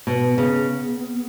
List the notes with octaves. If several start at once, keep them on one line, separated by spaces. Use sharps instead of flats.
B2 B3
C#3